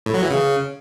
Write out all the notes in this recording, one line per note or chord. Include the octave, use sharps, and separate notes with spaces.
A2
F#3
E3
C#3